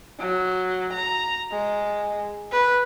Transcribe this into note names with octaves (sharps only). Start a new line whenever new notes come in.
F#3
A#5
G#3
B4